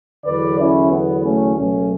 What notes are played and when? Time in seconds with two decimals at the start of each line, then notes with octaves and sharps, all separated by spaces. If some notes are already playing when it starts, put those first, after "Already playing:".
0.24 E2 D3 F#3 B4 D5
0.57 C#4 E4
0.90 B3
1.24 A3 C#4
1.56 C#2 B2 F#3 A3 C#4